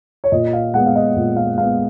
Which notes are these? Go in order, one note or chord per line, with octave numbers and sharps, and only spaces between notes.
C#5
A#2 D#5
F5
G#3 B3 F#5
F5
D#5
A#2
F5
G#3 B3 F5